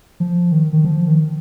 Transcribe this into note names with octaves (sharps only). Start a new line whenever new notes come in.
F3
D#3
D#3
F3
D#3